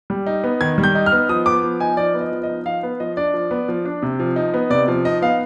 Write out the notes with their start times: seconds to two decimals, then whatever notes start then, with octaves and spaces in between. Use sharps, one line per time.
0.10 G3
0.27 D#4
0.44 B3
0.61 D#3 G#6
0.78 G3
0.84 G6
0.95 D#4
1.06 F6
1.12 B3
1.29 F3 D#6
1.46 B3 D6
1.64 F3
1.80 D#4 G#5
1.97 F3 D5
2.14 B3
2.20 D#5
2.32 F3
2.43 D#5
2.49 D#4
2.66 F3 F5
2.83 B3
3.00 F3 D#5
3.17 D4 D5
3.34 F3
3.51 B3
3.68 F3
3.85 D4
4.03 C3
4.19 F3
4.36 D#4
4.54 B3
4.70 C3 D5
4.88 F3
5.05 D#4 D#5
5.22 B3 F5